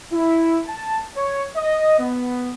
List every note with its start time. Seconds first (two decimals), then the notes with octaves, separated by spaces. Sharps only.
0.13 E4
0.67 A5
1.16 C#5
1.56 D#5
2.00 B3